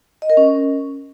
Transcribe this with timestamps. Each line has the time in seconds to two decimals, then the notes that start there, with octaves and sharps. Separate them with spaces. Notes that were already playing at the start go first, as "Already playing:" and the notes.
0.22 D#5
0.30 A#4
0.37 C#4